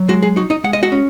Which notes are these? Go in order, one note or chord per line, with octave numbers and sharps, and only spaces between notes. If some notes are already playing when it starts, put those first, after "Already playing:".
Already playing: F#3
G#3 F#4
G#4
D#4 F#4
D#4 D#5
G#3 F#5
D#5
F#4 F#5
C#4